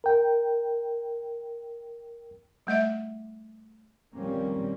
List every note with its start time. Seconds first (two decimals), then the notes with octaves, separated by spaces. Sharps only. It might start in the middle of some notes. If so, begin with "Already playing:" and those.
0.04 A#4 G5
2.67 G3 A3 D#5 E5
4.14 D#3 F3 G3 A#3 C4 C#4